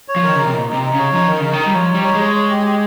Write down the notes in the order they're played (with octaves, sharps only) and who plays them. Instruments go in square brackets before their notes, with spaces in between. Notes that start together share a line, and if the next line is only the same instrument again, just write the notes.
[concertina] C#5
[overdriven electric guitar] F3
[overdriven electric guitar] D#3 [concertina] A#4
[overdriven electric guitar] C#3 [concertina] D#4
[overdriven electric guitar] C3
[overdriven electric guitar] A#2 [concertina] D#4
[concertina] D#4
[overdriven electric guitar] C3
[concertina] D#4
[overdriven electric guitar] C#3 [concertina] C#5
[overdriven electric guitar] F3 [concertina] D#4
[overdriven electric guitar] D#3 [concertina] A#4
[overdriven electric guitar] C#3 [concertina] D#4
[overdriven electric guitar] D#3
[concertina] D#4
[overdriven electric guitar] G3
[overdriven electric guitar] F3 [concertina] C#5
[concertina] D#4
[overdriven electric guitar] G3
[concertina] C#5
[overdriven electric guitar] G#3 [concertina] C#5
[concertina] C#5
G4
G4